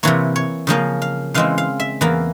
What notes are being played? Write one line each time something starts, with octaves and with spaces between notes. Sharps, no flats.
C3 E3 A#3 C#5
C#5
C#3 F3 A#3 C#4 F5
F5
C#3 E3 G#3 C4 F5
F5
E5
E2 E3 A#3